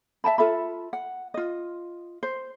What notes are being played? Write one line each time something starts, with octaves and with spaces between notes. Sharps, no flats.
E5 G5 A5 B5
F4 A4 E5 B5
F#5
F4 D#5
C5